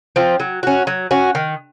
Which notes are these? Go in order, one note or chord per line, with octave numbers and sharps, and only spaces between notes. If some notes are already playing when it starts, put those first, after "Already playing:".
F3 C4
F#3
C#4 F#4
F#3
C#4 F#4
D#3